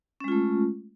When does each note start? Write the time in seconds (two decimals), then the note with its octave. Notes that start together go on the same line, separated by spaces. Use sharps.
0.20 C#4
0.24 G#3
0.28 F4
0.32 A3